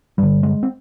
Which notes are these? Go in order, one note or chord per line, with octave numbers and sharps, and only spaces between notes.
G2 D3 G3
G#3
C4